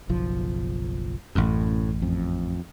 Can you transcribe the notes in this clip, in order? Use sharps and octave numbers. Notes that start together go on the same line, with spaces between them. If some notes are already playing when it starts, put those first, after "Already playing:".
F#1 B1 F3
A1 F#2 A2
F2